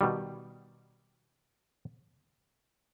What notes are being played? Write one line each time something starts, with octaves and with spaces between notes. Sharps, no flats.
B2 D#3 G3